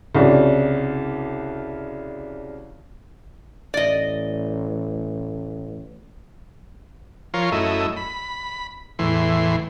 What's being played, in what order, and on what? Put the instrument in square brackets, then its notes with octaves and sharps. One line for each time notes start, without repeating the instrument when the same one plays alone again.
[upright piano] C2 C#3 F#3 D4
[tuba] A1 [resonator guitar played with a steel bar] D5 D#5
[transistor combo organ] F3 F4 A#4 C#5 C6
F#2 A3 E4 D#5
B5
E2 A2 E3 C6